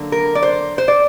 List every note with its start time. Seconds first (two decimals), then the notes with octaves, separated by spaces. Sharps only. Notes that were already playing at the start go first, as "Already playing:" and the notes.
Already playing: D3 F#3 A#3
0.12 A#4
0.35 D5
0.43 C5
0.78 C5
0.88 D5